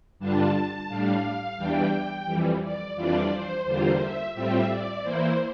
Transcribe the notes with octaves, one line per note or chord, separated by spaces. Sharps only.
G2 D3 G3 D4 F4 A5
A2 G3 D4 F5
E2 E3 G3 D4 G5
F2 E3 G3
D5
F2 E3 G3 D4 F4 D5
C5
E2 D3 G3 A#3 F4 C5
E5
A2 G3 C4 F4 E5
D5
E3 A#3 E4 C5